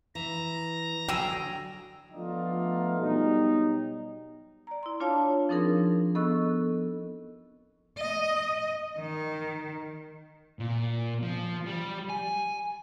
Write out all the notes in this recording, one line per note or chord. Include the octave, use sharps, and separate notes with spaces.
E3 A#5 A#6
D3 F#3 D4 G#4 G5 E6
F3 A3 B3 D4 D#4 F4
B2 F#3 G3 D#4
D5 A#5
E4 C6
D4 F4 C#5 F5 A5
F3 C4 D4 D#4 G#4 A#4
B3 A4 D#5 C#6 E6 F#6
D#5
D#3
A#2
F3
G3
G#5